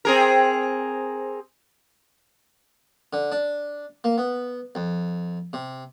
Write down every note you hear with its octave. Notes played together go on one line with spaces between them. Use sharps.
C4 G#4 A#4
D3
D4
A#3
B3
F2
C3